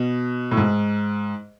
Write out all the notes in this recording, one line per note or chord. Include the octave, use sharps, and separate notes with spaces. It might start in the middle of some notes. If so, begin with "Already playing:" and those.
Already playing: B2
A2
G#2